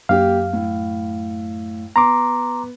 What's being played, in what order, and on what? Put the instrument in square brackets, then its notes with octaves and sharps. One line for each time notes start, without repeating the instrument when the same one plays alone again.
[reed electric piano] F#2 F5 [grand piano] A#3 G4
[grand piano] A2
[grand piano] B3 [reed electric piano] A#5 C6 D6